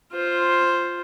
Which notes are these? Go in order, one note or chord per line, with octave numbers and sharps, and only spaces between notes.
F4 C5